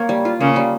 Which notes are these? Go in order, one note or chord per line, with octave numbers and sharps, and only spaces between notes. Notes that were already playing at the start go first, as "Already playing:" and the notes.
Already playing: A#3 C#5
G3
F4
C#3 A#3
G3